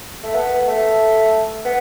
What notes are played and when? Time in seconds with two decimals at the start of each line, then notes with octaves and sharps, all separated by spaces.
0.23 A3
0.35 B3
0.68 A3
1.65 B3